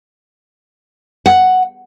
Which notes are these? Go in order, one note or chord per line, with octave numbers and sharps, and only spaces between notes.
F#5